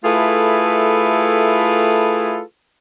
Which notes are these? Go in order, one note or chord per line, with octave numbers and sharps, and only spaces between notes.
A3 E4 F4 G#4 A4 B4